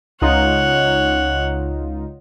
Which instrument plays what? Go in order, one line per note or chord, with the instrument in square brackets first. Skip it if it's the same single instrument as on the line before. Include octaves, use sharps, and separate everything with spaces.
[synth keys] C#2 D#4 F4 [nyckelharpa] C#5 F#5